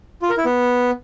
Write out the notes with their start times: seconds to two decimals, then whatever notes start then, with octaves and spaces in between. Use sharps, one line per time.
0.22 F4
0.30 A#4
0.38 E4
0.45 B3